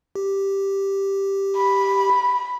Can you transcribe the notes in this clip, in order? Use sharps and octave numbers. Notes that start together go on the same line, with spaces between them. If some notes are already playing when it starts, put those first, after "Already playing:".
G4
B5